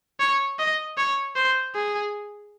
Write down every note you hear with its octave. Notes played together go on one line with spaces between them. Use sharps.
C#5
D#5
C#5
C5
G#4